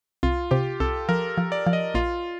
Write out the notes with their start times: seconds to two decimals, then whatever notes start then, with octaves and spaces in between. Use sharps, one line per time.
0.23 C2 F4
0.51 C3 G4
0.80 C2 A4
1.09 F3 A#4
1.37 F3
1.52 D5
1.66 F3
1.73 D#5
1.94 A#1 F4